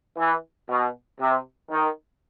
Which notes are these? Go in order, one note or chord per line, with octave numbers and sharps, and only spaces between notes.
E3
B2
C3
D#3